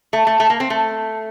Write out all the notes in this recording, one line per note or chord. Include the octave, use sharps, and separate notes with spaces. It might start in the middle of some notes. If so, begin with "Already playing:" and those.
A3
A3
A3
A#3
C4
A3